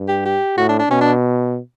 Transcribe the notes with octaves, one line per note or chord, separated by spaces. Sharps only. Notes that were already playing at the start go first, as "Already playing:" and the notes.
Already playing: G2
G4
G4
A2 F#4
D4
D4
B2 C#4
D4